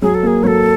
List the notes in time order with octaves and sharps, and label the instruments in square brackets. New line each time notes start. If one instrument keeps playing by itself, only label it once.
[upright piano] F#3 [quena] G#4
[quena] A4
[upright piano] A#3 [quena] G#4
[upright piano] F#3 [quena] A4 C#5